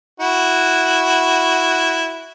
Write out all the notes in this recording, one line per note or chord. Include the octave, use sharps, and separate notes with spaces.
E4 F#4